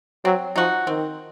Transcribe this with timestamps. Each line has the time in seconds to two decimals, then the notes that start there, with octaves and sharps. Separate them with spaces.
0.25 F#3 C4
0.56 F3 D#4 F#4
0.87 D#3 C4